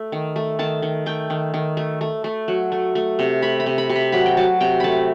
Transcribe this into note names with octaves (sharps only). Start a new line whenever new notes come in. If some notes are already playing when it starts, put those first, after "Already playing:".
Already playing: A3
D#3
A3
D#3 A5
D#3
A3 G5
D#3
D#3
A3
A3
A3
F#3
A3
A3
C3
A3 B5
B5
C3
B5
C3
B5
F#3 B5
G5
F#3 A5
C3 G5
A3 A5 B5